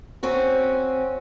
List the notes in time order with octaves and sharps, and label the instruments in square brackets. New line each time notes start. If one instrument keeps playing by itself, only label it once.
[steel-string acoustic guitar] C4 C#4 F#4